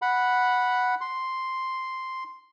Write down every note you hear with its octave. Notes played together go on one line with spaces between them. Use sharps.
F#5 B5
C6